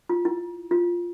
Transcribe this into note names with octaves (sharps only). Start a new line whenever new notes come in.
F4
E4
F4